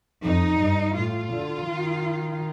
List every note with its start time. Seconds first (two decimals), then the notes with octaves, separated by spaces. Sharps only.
0.24 F2 D#4
0.60 G2
0.96 A2 F4
1.33 D3
1.68 D#3